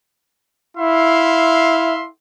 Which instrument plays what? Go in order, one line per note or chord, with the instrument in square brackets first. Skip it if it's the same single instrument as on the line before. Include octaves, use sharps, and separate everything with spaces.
[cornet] E4 [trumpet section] E5 F5 C6